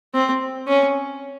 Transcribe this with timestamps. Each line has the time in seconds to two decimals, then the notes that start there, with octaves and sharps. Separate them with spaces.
0.14 C4
0.68 C#4